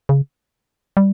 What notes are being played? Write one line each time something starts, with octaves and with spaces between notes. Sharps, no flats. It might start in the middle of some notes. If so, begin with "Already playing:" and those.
C#3
G3